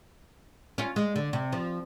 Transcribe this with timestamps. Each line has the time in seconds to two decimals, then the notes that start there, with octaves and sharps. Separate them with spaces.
0.78 C#4 F4
0.96 G#3
1.16 D3
1.33 C3
1.52 F3